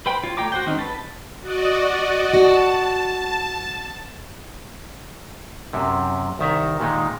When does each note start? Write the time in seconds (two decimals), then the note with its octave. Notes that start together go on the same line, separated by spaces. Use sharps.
0.06 B4 C5 G5 B5
0.23 F4 C#5
0.37 A3 C#5 G5 A#5 D6
0.52 F#4 C5 G5
0.66 D#3 G#3 C4 C#4 D#4
0.79 B4 A5
1.41 F#4 D5 D#5
2.34 F#4 A5
5.73 F#2 C3
6.39 C2 D#3 E5 A#5
6.80 A#2 D#3 G#3 D#4